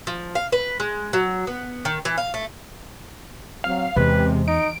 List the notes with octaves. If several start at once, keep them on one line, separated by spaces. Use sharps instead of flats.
F3
F5
B4
G#3
F#3
B3
D#3
E3
F5
A3
F#3 C4 F5
E2 C3 G#3 B4
D#4 D7